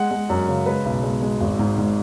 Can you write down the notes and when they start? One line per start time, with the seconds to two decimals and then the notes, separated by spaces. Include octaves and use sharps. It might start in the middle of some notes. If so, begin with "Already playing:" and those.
Already playing: G#3 F#5
0.11 G#3
0.30 F#2
0.48 C#3
0.66 G#3 B4
0.85 B1
1.03 G#3
1.22 G#3
1.41 G#1
1.59 G#2
1.78 G#2